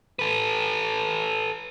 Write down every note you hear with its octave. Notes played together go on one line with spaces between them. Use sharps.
A4 B4